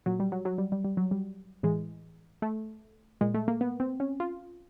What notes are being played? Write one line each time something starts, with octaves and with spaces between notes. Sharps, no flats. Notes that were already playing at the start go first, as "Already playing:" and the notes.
A#2 F#3
G3
F#3
F#3
G3
G3
G3
F#3
G3
A2 E3 G#3
A3
A#2 G#3
A3
A#3
B3
C4
C#4
F4